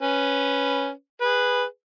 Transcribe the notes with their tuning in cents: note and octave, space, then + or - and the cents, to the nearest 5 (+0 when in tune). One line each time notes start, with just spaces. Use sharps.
C#4 +0 B4 +0
G#4 -20 B4 +0